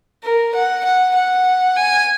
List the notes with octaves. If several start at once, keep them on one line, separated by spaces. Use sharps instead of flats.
A#4
F#5
F#5
F#5
G#5